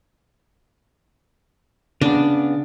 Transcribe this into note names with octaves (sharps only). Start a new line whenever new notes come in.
C#3 B3 D4